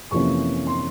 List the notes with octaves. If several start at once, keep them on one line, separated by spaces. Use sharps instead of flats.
F2 C3 E3 A#3 C#4 C#6
C6